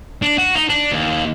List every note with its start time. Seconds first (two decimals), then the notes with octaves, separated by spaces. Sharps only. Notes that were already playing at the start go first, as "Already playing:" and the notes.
0.22 D4
0.38 F#4
0.55 D#4
0.69 D4
0.92 D#2